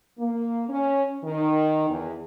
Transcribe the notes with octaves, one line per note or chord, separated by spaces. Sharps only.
A#3
C#4
D#3
E2